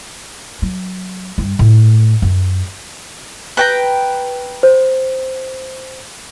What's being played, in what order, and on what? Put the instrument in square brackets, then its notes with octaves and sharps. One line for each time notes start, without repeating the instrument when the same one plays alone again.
[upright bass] F#3
G2
A2
F#2
[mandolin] B4 G5 A#5
[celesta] C5